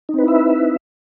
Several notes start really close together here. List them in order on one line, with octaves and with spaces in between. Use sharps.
D#4 C4 B4 E4 E5